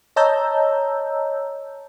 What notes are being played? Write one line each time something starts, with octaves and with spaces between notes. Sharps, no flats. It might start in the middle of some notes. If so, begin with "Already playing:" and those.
C#5 D#5 A5 A#5 E6 G6